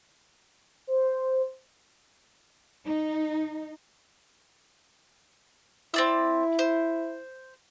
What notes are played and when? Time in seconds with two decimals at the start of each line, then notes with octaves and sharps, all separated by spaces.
0.87 C5
2.87 D#4
5.94 C4 E4 D5 E6
6.59 C5